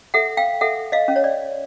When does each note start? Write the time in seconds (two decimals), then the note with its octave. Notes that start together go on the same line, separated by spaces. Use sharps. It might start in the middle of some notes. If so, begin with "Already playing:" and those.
0.14 A4 E5 F#5
0.37 F5 G5
0.61 A4 E5 F#5
0.92 D#5 F5
1.08 C#4
1.16 C#5
1.24 D5